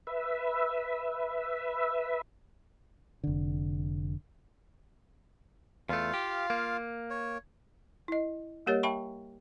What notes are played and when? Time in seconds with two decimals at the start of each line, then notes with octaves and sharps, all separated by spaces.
0.07 B4 E5
3.24 F1 D3
5.89 E2 A3 F4 F5
6.14 G4
6.50 A#3
7.10 C#5
8.08 E4 D#5
8.66 G3 A#3 G4 A#4 C#5 D#5
8.83 E5 G5 A5 B5 C#6